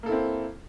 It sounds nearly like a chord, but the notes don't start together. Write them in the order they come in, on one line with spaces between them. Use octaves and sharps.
A#3 A4 E4 C4